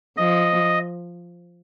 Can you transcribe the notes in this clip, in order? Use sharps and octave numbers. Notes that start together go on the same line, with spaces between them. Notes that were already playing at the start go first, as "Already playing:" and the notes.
F3 D#5